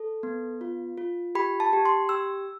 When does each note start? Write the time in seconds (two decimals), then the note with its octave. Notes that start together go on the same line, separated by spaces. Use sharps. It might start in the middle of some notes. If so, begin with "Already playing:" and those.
Already playing: A4
0.23 B3
0.61 F4
0.98 F4
1.35 G4 B5
1.60 A5
1.73 G4
1.85 C6
2.09 G4 E6